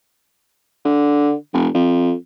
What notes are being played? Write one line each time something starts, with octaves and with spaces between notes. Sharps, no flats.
D3
F1
F2